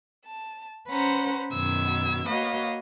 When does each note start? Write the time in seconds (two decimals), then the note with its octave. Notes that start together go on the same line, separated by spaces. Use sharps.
0.25 A5
0.90 C#4 B4 C5 F#5 A#5
1.52 F#2 B2 D#3 E6 G#6
2.27 A#3 F#4 B4 C#5 D#5 F5